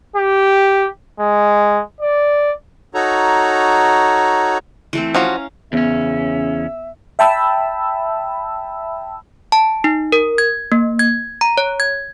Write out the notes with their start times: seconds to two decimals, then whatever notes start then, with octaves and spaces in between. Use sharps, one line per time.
0.16 G4
1.20 G#3
2.01 D5
2.94 D#4 F#4 A4 C#5 A#5
4.93 E3 A3 C4
5.15 F3 C#4 F#4 F5 A#5
5.73 E2 C#3 B3 C#4 E5
7.19 E5 G5 A5 B5 E6
9.52 A5
9.84 D#4
10.12 A#4
10.38 G#6
10.72 A#3
10.99 G#6
11.41 A#5
11.58 C#5
11.80 G#6